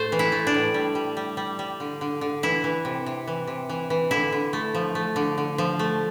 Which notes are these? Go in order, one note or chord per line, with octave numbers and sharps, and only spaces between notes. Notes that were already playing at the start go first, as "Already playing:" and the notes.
Already playing: A2 A3 C5
E3
E4
A3
D4
A2
G3
G3
G3
G3
G3
D3
D3
D3
E3 E4
E3
C3
C3
E3
C3
E3
E3
D3 E4
D3
A3
F3
A3
D3
D3
F3
A3